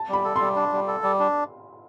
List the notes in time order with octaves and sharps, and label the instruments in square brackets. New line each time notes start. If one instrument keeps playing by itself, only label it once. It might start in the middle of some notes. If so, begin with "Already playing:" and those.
Already playing: [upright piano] A5
[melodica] G3 [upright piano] B5
[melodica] A4
[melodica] G3 [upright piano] C6
[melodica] D4
G3
A4
G3
D4